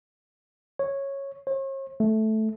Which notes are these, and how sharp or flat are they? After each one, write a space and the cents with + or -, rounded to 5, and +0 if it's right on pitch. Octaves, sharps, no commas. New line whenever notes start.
C#5 -10
C#5 -45
A3 -10